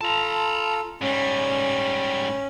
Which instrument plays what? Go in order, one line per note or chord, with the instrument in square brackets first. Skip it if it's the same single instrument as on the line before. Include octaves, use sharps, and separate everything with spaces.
[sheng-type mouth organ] F4 A4 [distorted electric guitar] A5 A#5
[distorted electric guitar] G#2 G3 [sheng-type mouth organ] C#4